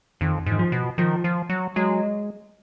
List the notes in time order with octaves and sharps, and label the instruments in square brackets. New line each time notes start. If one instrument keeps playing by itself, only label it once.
[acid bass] F2 [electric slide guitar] D#3
[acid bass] G#2
[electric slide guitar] D#3
F3
[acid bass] B2
[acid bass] D#3 [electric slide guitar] F3
[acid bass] F3
F#3
[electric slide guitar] F#3 [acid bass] G#3